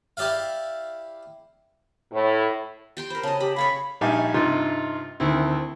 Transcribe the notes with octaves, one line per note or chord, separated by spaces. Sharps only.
E4 G4 D5 E5 F5
A2
G4 G5 C6
A#4 C5 B5
C#3 D#5 A5
G4 B5
G#4 A4 C#5 F5 B5
A#1 G3 D#4 E5 F5 G#5
G2 C3 D#4 F4
D2 D3 D#3 C4 E4